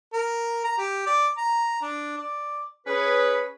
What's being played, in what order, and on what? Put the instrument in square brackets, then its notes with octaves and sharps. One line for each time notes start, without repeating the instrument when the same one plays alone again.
[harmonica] A#4
A#5
G4
D5
A#5
D4
D5
[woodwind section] C#4 G#4 B4